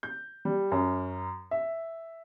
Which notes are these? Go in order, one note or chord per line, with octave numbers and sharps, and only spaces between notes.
G6
G3
F#2
E5